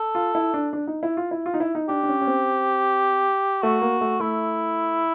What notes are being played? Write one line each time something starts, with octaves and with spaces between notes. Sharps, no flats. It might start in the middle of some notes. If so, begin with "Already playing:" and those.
Already playing: A4
F4
E4
D4
D4
D#4
E4
F4
E4
F4
D#4
E4
D#4
D4 G4
D4
C#4
C#4
C4
A3 F#4
A#3
A3
A3 E4